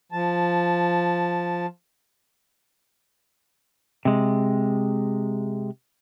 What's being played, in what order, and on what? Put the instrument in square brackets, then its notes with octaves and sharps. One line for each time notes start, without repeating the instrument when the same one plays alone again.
[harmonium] F3 A5
[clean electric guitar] C3 G#3